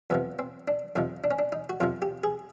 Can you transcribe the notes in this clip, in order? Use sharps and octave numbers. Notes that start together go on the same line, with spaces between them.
F2 C3 F3 B3
C4
D4
F2 C3 F3 D#4
D4
C#4
D4
D#4
F#4
F2 C3 F3 F4
G4
G#4